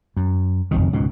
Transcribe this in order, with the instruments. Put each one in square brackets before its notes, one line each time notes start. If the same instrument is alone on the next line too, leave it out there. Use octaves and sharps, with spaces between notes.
[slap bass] F#2
F1 B1 F2 D#3
C#2 G#2 B2